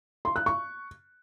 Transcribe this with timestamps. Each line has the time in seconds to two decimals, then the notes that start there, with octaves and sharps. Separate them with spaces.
0.25 C6
0.36 F#6
0.46 C#6